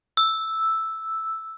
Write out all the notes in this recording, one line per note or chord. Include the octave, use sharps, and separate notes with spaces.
E6